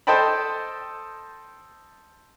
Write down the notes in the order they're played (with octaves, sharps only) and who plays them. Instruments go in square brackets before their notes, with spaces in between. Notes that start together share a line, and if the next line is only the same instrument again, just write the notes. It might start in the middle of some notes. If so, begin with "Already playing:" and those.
[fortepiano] A4 C5 D#5 G5 A5 B5